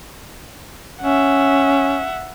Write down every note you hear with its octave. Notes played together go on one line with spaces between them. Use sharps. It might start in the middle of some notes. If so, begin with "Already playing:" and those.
C#4 E5 F#5